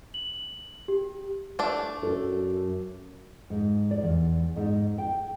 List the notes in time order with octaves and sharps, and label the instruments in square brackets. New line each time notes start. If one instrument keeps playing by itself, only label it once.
[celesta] F#7
G4
[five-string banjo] A3 D4
[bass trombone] F#2 [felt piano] A4
[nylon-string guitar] G#2
D5
E2
G#2
G5